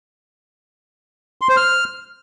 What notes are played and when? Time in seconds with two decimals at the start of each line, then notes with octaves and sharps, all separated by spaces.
1.41 C6
1.49 C5
1.57 F6